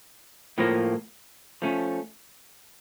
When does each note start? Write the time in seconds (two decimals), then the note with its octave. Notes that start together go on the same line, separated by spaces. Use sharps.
0.58 A2 F3 A#3
1.62 F3 A3 C#4